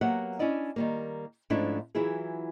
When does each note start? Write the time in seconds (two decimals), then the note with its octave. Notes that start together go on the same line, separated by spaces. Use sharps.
0.01 F#3 A#3 B3 G4 E5 F#5
0.39 C#4 D4 E4 D5 D#5
0.76 D#3 G3 A#3
1.50 G#2 F3 A3 C#4 D4 E4
1.95 E3 F#3 E4 F4 G#4